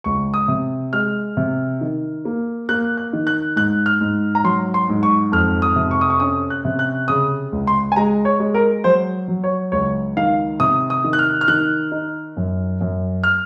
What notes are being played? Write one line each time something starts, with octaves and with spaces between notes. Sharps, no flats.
C#2 C#6
D#6
C3
G#3 F6
C3
D#3
A#3
A#3 F#6
F#6
D#3
F#6
G#2 F#6
F6
G#2
A#5
F#3 C6
C6
G#2
C#6
F2 F6
D#6
C3
C#6
D#6
C#6
C#4 D#6
F#6
C3
F#6
C#3 D#6
C#2
C6
G#5
G#3 A#5
C#5
G#3
A#4
F#3 C5
F#3
C#5
C#2 C#5
D#3 F5
C3 D#6
D#6
D#3
F#6
F6
F6
D#3 F#6
D#4
F#2
F#2
F6